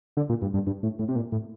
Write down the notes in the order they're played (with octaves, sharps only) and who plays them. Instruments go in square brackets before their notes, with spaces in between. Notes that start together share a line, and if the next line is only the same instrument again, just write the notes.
[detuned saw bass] D3
A#2
G2
G2
G2
A2
A2
C3
A#2
A2